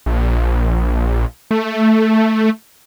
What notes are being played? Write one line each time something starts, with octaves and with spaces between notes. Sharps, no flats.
A#1
A3